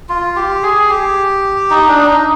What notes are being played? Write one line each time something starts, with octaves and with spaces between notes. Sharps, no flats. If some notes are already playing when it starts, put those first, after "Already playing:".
F4
G4
G#4
G4
D#4
D4
D#4